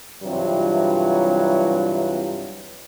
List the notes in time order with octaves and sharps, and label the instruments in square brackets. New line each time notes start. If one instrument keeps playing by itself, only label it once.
[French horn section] G2 C3 E3 F#3 F4